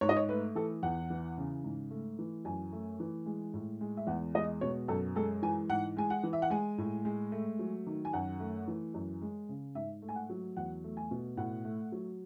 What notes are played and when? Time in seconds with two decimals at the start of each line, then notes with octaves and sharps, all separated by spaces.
0.01 G#2 C#5
0.09 D#5
0.16 C#5
0.29 A3 B4
0.55 E3 A4
0.83 E2 F#5
1.10 E3
1.38 C#3
1.64 G#2
1.91 A3
2.19 E3
2.45 F#2 G#5
2.72 A3
3.00 E3
3.26 G#3
3.54 A2
3.81 G#3
3.97 E5
4.07 E2 F#5
4.34 G#3 D#5
4.61 B2 C#5
4.88 F#2 A4
5.15 G#3 A4
5.42 E3 G#5
5.69 G#2 F#5
5.97 G#3 G#5
6.10 F#5
6.23 E3
6.33 E5
6.42 F#5
6.50 G#3 G#5
6.78 A2
7.05 G#3
7.32 A3
7.59 F#3
7.87 D#3
8.05 G#5
8.13 F#2 F#5
8.40 A3
8.68 E3
8.94 F#2
9.22 G#3
9.49 C#3
9.75 G#2 E5
10.02 A3
10.09 G#5
10.16 F#5
10.30 F#3
10.57 E2 F#5
10.84 A3
10.97 G#5
11.11 B2
11.37 A2 F#5
11.65 A3
11.92 F#3